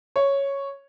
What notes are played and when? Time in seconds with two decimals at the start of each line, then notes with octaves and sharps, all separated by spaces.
0.16 C#5